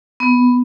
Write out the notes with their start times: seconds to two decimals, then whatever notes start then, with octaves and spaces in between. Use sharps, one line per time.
0.20 B3